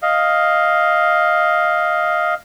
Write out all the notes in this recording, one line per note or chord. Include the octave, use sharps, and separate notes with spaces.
D#5 F5